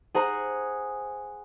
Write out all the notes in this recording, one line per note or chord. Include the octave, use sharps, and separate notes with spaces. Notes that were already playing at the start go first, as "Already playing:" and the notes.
G#4 C5 F#5 G#5 A#5